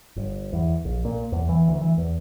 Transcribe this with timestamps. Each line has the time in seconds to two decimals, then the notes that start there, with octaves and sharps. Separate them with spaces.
0.16 G1
0.53 E2
0.85 A#1
1.05 A#2
1.32 E2
1.49 E3
1.68 D2
1.81 E3
1.98 E2